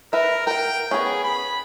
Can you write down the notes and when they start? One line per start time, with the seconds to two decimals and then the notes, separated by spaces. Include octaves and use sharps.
0.13 A#4 B4 E5
0.47 A#4 F#5 G5
0.91 B3 C#4 G#4
1.24 B5